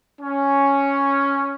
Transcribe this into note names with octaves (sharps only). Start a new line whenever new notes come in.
C#4